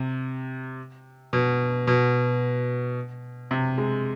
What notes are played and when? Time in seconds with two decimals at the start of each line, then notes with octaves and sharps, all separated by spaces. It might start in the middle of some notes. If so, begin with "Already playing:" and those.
Already playing: C3
1.33 B2
1.87 B2
3.51 C3
3.78 G#3